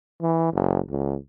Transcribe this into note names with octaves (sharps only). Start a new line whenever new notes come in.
E3
F#1
C#2